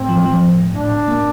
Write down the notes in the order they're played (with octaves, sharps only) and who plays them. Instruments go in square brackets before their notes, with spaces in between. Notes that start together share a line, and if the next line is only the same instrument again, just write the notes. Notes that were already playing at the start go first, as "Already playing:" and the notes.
Already playing: [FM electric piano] A2 [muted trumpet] C4
[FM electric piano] F3
F3
A2
A2
[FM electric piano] A2 [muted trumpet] D4
[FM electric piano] A2
A#3